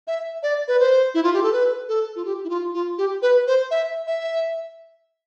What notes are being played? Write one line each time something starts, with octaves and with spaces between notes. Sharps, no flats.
E5
D5
B4
C5
E4
F4
G4
A4
B4
A4
F4
G4
E4
F4
F4
G4
B4
C5
E5
E5